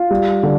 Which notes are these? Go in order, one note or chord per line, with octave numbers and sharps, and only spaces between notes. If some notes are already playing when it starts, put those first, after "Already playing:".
Already playing: F4
G3
D3